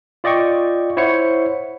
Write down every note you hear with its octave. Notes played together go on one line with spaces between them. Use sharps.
F4 D5 D#5 G5 C#6
E4 C5 C#5 F#5 C#7